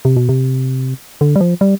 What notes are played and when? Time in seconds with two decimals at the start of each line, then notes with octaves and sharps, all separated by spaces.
0.05 C3
0.16 B2
0.29 C3
1.21 D3
1.36 G3
1.41 F3
1.61 G3